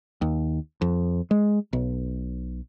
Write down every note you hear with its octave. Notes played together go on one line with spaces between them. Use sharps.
D#2
F2
G#3
B1